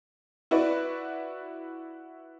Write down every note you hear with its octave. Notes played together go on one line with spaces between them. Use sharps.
E4 F#4 B4 D5